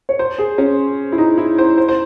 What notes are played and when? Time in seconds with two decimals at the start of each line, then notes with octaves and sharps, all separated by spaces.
0.09 C#5
0.19 C5
0.38 G#4
0.58 C#4
1.12 E4
1.18 D#4
1.38 E4
1.58 C5
1.78 C5
1.88 C5